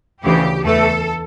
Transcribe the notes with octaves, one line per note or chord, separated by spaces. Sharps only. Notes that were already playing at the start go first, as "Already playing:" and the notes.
D2 C#3 E3 G4
E2 E3 A3 A4